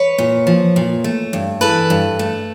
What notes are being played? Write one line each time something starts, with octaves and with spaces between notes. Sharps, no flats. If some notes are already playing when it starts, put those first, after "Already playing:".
Already playing: B4 C#5
A#2
F3
A#2
A3
G2
E3 A4 B4
G2
A3